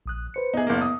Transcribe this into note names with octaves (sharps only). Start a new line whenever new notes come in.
A#1 D#6 F#6
B4 C5 C#7
B3 D#4 G#4 E5
F#1 A#3
D#6